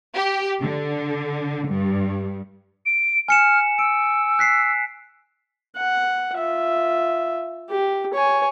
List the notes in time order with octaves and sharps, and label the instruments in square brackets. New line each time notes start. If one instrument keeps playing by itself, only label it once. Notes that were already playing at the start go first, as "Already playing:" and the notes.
[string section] G4
D3
G2
[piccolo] D7
[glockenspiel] G#5 C#7 E7 [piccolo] F6
[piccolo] E6 [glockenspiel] D7
[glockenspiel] F#6 B6 C7
[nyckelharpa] F#5
F4 E5
G4
C#5 G#5